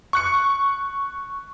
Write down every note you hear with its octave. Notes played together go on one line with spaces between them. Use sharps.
C#6 F#6 C#7